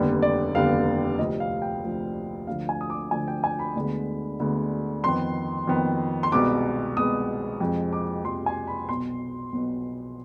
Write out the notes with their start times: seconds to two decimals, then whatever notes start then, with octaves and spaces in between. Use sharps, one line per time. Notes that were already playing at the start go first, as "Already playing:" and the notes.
Already playing: F1 D#2 D3 G3 B3
0.22 D5
0.55 F1 D#2 D3 G3 B3 F5
1.19 D2 C3 F3 D#5
1.40 F5
1.62 G5
1.83 D2 C3 F3
2.47 D2 D3 F3 F5
2.69 G#5
2.81 D#6
2.90 D6
3.11 D2 D3 F3 G#5
3.28 G5
3.44 G#5
3.59 B5
3.75 D2 D3 G#3 B3
4.40 D2 D3 G#3 B3
5.04 F2 D#3 B3 C6
5.67 F2 D#3 B3
6.23 C6
6.32 C2 B2 G#3 B3 D6
6.97 C2 B2 G#3 B3 D#6
7.60 F2 C3 F3 G#3
7.93 D6
8.25 F2 C3 F3 G#3 C6
8.46 G#5
8.67 B5
8.89 B1 B2 B3 C6
9.52 B1 B2 B3